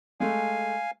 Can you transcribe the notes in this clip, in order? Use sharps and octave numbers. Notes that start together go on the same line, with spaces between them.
G#3 A3 F5 G#5